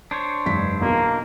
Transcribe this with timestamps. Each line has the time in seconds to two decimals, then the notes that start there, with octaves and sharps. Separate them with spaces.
0.11 D4 C5 C#5
0.46 F1 G2 B6
0.81 B1 E2 B2 A#3